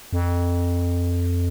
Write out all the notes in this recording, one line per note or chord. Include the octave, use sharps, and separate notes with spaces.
F2